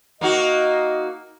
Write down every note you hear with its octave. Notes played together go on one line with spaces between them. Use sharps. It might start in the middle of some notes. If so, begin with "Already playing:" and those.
A#3 D#4 F#4 D#5